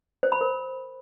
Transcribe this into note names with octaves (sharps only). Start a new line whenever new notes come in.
C5
B5
A#4